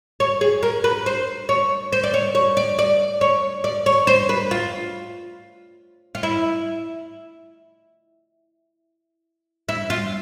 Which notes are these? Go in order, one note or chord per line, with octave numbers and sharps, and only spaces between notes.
C#5
G#4
A#4
B4
C5
C#5
C5
D5
C#5
C#5
D5
D5
C#5
D5
C#5
C5
B4
F4
F4
E4
E4
F4